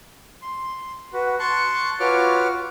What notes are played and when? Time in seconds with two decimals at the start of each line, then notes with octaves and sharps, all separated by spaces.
0.42 C6
1.13 F#4 B4
1.39 A5 C6 C#6 F#6
2.00 F4 F#4 B4 C#5 D6 F6